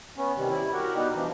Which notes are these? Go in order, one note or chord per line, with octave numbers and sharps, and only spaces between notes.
B3 C#4
C3 D#3 G3
G3 E4
F#4 G4 A#4 F#5
B2 G3 B3 D#4 G4
E3 F3 D4